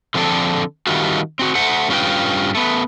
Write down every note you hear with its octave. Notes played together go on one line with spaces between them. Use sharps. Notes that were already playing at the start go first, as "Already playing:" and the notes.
D3 F3 C4 D4 A4
D#3 G3 A3 C4 F4 F#4
C4 F#4
A3 C5 F#5
G2 C#4 F4 B4 G5
A3 B3